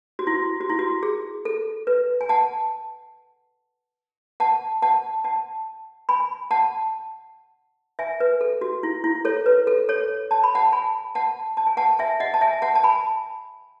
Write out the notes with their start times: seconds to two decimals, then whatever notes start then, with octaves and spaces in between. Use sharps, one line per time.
0.19 F#4
0.27 E4
0.34 F#4
0.61 F#4
0.69 E4
0.79 F#4
1.03 G#4
1.45 A4
1.87 B4
2.21 G#5
2.29 F#5 A5
4.40 F#5 A5
4.82 F#5 A5
5.24 F#5 A5
6.09 G#5 B5
6.51 F#5 A5
7.99 E5 G#5
8.20 B4
8.41 A4
8.61 F#4
8.83 E4
9.04 E4
9.25 A4 C#5
9.46 B4
9.67 A4
9.89 A4 C#5
10.31 A5
10.44 B5
10.55 F#5 A5
10.72 G#5 B5
11.15 F#5 A5
11.57 A5
11.67 G#5
11.77 F#5 A5
11.99 E5 G#5
12.20 D#5 F#5
12.34 A5
12.41 E5 G#5
12.62 F#5 A5
12.75 A5
12.83 G#5 B5